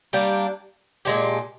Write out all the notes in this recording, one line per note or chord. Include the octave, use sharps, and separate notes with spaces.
G3 A#3 D4
A#2 G#3 D4 G4